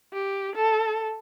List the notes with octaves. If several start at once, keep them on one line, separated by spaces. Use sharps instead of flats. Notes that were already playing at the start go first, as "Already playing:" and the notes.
G4
A4